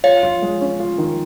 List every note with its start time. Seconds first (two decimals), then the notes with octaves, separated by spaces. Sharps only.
0.04 F4 C#5 F5
0.23 F4
0.42 G#3
0.61 C#4
0.80 F4
0.98 D#3